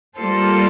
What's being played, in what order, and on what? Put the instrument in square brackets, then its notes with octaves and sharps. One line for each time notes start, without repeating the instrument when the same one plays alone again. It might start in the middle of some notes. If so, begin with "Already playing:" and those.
[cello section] G3 A#3 F4 A4 C5